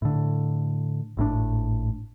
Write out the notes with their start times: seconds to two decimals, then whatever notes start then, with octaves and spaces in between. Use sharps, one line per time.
0.02 A2 D3
1.17 G#1 A2 C#3 D4